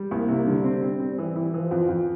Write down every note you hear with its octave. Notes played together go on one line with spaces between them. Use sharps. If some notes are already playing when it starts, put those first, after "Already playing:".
Already playing: G3
C2 A#3
C3
D3 G3
C4
C4
C4
E3 G3
E3
E3 F3
F2
F2